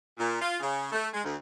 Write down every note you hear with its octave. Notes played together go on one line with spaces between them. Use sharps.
A#2
F4
C#3
A3
G#3
D2